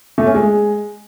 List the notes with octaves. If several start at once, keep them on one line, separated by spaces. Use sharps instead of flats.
A3
C#4
G#3